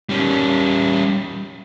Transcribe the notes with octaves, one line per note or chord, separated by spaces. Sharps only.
G3 C#4